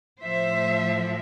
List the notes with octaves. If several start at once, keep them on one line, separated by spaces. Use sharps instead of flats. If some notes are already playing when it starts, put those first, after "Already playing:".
A2 F3 C5 E5